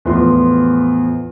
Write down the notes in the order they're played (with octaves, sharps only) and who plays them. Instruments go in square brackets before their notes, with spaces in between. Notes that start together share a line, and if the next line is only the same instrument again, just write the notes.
[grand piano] E2 A2 F3 C6